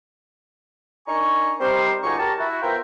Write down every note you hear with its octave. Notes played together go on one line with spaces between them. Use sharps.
D4 D#4 A#4 G#5 A#5 C#6
G3 C4 D#4 G4 A#4 C5
C#2 F#3 A#3 D#4 G#5 C#6
G4 A#4 A5
E4 F#4
B3 F4 A#4 C5 E5 G5